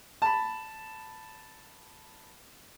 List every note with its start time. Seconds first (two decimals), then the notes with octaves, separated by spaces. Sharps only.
0.22 A5 B5